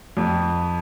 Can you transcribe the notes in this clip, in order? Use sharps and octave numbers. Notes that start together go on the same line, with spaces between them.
F2